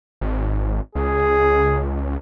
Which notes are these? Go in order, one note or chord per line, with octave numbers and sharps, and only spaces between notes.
G#1
C#2 G#4